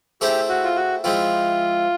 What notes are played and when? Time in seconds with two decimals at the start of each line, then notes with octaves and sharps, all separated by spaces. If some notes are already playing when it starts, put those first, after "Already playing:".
0.21 A3 C4 E4 G4 G#4 C5
0.49 F#4
0.64 F4
0.76 F#4
1.04 F3 G#3 C4 E4 F4